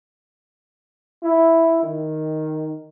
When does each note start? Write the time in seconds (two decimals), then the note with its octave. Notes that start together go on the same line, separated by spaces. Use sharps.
1.23 E4
1.83 D#3